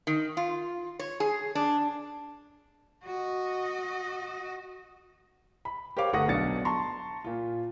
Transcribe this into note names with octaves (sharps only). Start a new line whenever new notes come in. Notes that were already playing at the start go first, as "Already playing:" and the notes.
D#3
F4
C#5
G#4
D4
F#4 D#5
B5
G4 A#4 C5 C#5 F5 D6
G1 A3 F#5 C#6 D#6 A#6
B1 D4 A6 C#7
A5 A#5 C6 C#6
A#2 F4